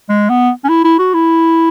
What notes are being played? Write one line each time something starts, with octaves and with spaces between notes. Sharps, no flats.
G#3
B3
C#4
E4
E4
F#4
E4